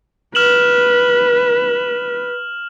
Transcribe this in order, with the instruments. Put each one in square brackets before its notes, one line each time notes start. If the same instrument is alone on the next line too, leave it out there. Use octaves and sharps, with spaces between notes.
[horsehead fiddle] B4 [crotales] F6 E7 F#7